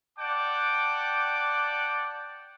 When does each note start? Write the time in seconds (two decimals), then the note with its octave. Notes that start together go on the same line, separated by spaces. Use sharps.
0.19 D5 F#5 G5 A5 D6